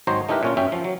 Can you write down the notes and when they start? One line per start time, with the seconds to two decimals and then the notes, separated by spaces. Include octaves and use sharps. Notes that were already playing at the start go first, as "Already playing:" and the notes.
0.07 G#1 F#3 D#4 C5 C#5 A#5
0.29 A3 D#4 E4 G4 A#4 B4
0.43 A#2 C#4 F4
0.57 F#2 C#4 E5 G5
0.72 F3
0.84 F#3